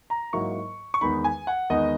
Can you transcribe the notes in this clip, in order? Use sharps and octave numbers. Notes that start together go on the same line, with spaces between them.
A#5
G#2 F#3 A#3 E4 C#6
C#6
E2 D#3 G#3 B3 D#4 B5
G#5
F#5
E2 D#3 G#3 B3 D#4 D#5